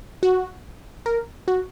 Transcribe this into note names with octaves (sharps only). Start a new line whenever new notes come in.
F#4
A#4
F#4